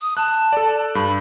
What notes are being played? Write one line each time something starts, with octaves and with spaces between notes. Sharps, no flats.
D#6
A5 F#6
A4 D5
G2 B5